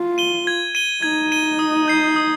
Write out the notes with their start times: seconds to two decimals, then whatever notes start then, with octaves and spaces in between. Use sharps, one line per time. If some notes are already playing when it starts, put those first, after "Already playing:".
Already playing: F4
0.18 D#7 G7
0.47 G#6
0.75 D#7 G7
1.03 D#4 G#6
1.32 D#7 G7
1.59 D#6
1.88 G6 C7
2.16 D#6